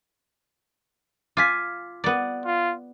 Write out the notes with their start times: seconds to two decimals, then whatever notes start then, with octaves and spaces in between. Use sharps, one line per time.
1.37 F4 G#5 D6 B6
2.04 B3 D5
2.46 F4